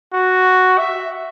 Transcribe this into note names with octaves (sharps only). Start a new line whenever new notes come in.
F#4
E5